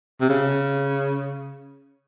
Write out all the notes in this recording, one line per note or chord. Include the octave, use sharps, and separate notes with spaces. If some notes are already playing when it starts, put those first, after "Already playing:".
C3
C#3